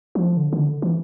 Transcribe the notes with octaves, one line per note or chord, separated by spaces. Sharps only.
F3
D3
D3
E3